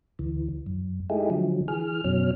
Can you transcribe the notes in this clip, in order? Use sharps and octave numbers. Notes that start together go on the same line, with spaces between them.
D2 E3
F#2
G#3 A3 D#4 E4 G4 G#4
D3 F3 F#3
E3 G#4 F6
F#2 B2 F#3 C#4 F6